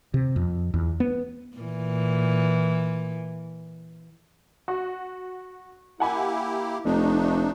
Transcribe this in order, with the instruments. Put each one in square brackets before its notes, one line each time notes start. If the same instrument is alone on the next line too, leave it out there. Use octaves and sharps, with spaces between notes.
[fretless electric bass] C3
F2
E2
B3
[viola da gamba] A#2 E3
[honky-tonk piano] F#4
[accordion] A#3 E4 G4 [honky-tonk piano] F#5 G#5 B5
[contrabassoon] F1 [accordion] A3 D4 D#4 [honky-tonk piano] D#5